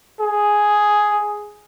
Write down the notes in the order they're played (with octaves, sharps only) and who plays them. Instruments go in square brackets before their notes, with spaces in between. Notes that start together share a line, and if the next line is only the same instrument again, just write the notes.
[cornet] G#4